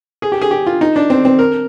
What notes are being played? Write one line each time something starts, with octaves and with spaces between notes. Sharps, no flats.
G#4
G4
G#4
G4
F4
D#4
D4
C4
C4
A#4